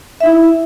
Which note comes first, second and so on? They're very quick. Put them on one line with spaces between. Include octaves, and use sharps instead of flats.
E5 D#4 E4